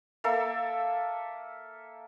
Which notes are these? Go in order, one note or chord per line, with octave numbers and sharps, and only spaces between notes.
A#3 A4 E5